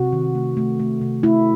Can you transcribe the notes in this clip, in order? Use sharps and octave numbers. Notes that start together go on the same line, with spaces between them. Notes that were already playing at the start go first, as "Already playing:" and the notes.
Already playing: C3 F#4
D#3
A3
A3
A3
C3
A3 E4